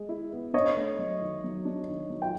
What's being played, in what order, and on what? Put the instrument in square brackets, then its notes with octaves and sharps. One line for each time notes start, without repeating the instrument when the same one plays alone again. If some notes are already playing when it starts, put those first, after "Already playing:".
Already playing: [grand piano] G#3
E4
B3
[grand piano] D4 [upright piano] C#5 D#5
[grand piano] A3
F#3
D#3
F#3
D4
D#3
F#3
[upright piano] G5